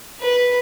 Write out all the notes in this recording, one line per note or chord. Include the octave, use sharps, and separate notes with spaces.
B4